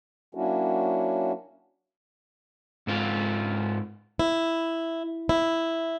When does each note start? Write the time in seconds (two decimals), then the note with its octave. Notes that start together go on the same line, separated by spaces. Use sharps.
0.35 F#3 A#3 C#4 D4 E4 F#4
2.87 G#2 C4 F4
4.19 E4
5.29 E4